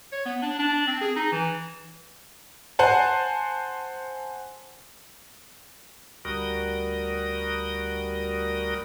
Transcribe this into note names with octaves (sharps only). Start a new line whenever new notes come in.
C#5
B3
D4
D4
C4
G#4
D#4
E3
C5 F#5 G#5 A5
D2 G3 F#4 A#4 D#6